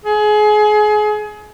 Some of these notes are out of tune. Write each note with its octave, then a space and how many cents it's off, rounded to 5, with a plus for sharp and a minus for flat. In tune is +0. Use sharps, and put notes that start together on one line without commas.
G#4 +30